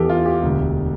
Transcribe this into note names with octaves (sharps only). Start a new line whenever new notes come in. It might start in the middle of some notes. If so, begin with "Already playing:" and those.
Already playing: E2 E3 G4 A4
F4
G4
E1 D2 D3